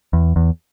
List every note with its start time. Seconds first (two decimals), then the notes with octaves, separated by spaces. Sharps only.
0.13 E2
0.36 E2